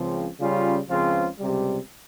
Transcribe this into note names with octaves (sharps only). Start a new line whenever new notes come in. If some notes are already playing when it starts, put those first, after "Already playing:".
Already playing: C#2 C#3 F3 C4
C#3 G3 C#4 F4
C#2 C#3 F3 C4 F4
C#2 C3 G3